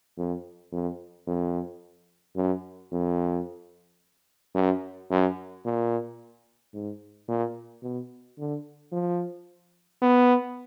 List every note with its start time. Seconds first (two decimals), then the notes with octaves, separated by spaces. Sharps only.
0.17 F2
0.72 F2
1.27 F2
2.36 F#2
2.92 F2
4.55 F#2
5.10 F#2
5.65 A#2
6.74 G#2
7.28 A#2
7.83 B2
8.38 D3
8.92 F3
10.02 B3